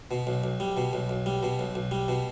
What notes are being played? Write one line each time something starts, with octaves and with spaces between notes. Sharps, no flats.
B2
B1
B1
G3
B2
B1
B1
G3
B2
B1
B1
G3
B2